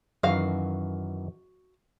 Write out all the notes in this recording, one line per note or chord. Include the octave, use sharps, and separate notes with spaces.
F#2 D#3 E3 F#4 F5